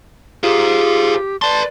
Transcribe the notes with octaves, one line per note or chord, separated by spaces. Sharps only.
F4 G4 G#4 C5
B4 D5 A5 C6